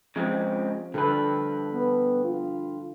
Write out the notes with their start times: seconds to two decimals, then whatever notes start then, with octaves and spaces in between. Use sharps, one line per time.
0.16 C#3 F3 G#3 C4
0.94 G2 D3 A4 B4
1.73 B3
2.24 F4